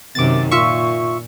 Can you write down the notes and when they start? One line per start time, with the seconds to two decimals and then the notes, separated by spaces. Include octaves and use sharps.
0.15 F#2 C3 D#3 D6 A6
0.51 A#2 F4 E5 C#6